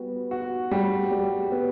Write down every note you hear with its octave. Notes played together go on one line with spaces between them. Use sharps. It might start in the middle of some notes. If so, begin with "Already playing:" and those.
Already playing: G3 B3 F#4
F#4
G3
G3
B3